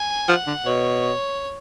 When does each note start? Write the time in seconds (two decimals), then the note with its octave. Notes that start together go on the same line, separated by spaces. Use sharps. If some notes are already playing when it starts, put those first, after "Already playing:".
Already playing: G#5
0.29 F3 F#5
0.47 D3
0.66 B2 C#5